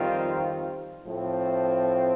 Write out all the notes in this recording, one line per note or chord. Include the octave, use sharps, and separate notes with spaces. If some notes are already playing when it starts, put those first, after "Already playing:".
Already playing: F2 D#3 G3 C4 F4
A2 F3 A3 C4